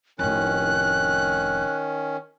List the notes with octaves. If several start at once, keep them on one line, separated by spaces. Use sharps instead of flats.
F1 A2 D#3 C#4 F#6